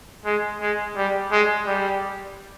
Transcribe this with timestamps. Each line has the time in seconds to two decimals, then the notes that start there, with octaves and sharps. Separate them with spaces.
0.25 G#3
0.61 G#3
0.96 G3
1.31 G#3
1.66 G3